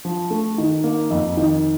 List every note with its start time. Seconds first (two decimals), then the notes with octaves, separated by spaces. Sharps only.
0.05 F3
0.30 A3
0.58 D#3
0.84 A#3
1.11 F2
1.37 D#3